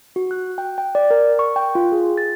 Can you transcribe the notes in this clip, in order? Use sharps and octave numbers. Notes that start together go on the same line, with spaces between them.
F#4
F#6
G5
G5
D5
A#4
C#6
G5
F4
G#4
A6